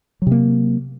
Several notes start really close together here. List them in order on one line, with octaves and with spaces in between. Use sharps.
F#3 C3 A#3